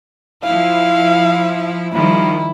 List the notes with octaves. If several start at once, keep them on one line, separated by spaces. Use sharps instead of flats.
F3 E4 F5
D#3 F3 G3 E4